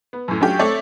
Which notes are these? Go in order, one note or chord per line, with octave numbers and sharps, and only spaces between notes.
B3
F#2 A2
F#3 A3 C#4 D4 F4 G4
A3 C4 A4 C#5 D5 E5